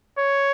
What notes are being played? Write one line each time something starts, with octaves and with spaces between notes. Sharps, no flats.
C#5